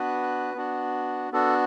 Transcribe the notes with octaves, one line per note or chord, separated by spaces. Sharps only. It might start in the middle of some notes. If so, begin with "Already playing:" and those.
Already playing: B3 D4 F#4 B4
B3 D4 F#4
B3 D4 F#4 A4